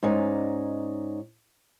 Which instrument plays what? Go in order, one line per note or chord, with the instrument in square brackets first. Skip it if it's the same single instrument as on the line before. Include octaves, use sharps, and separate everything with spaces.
[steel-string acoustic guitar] G#2 C#4 D#4 D5